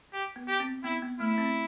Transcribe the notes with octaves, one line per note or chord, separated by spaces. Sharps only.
G4
B3
G4
C4
B3 E4
B3
A3 E4
C4